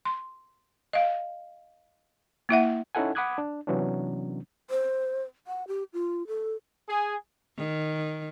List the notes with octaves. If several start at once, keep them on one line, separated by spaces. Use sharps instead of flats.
C6
D#5 F5
A#3 E4 E5 F#5
C#4 D#4 E4 A4 F#5 G#5
F#5 B5 D6 D#6 F#6 G#6
D4
C3 E3 F#3 B3 C#4 D4
C5
F#5
G4
F4
A4
G#4
D#3